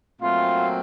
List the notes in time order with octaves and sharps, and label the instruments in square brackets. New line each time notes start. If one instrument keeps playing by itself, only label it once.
[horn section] A#2 F#3 A3 C4 F4